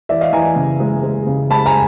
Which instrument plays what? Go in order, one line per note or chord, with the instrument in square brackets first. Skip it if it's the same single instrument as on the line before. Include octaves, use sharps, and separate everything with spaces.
[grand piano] E3 D5 E5
D#5 F5
E3 G#5 A#5
C#3
G#3
G#3
C#3
G#3 A5 B5
G#5 A#5